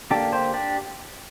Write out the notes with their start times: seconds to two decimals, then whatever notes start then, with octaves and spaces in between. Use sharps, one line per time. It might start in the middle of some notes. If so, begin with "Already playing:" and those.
0.11 D3 A#3 D4 G4
0.33 G4 C5
0.54 D4 G4